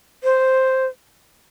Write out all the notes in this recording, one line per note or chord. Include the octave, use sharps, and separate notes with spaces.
C5